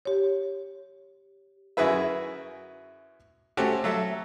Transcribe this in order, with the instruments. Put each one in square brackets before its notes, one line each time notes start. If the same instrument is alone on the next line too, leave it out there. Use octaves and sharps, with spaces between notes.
[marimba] G4 C#5
[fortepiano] F#2 E4 F#4 G#4 B4 E5
A3 C4 C#4 F#4 G4
F#3 A4 E5